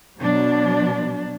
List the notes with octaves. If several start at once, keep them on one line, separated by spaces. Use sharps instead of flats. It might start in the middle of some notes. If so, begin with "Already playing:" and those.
B2 F#3 D4